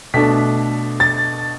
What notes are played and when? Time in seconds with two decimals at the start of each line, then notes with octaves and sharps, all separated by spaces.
0.14 B2 A3 D4 B6
1.00 A6